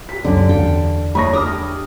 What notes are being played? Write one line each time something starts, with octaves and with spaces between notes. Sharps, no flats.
G4 B6
C#2 F#2 D3 C#4 D5
E2 A4 F5 G5
A3 G#4 C#5 D#5 B5 C#6 A#6
D4 G4 E5 A#5 D6 D#6 F6